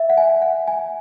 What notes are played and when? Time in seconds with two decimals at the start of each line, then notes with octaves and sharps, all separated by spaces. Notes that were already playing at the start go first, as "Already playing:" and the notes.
Already playing: E5
0.10 F#5
0.18 G#5
0.42 F#5
0.68 G#5